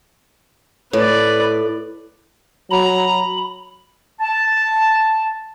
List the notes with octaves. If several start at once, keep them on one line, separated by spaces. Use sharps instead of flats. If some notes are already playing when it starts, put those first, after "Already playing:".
A2 B4 D5
F#3 A#5 B5
A5